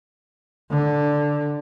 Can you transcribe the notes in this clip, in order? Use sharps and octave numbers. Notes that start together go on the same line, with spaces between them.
D3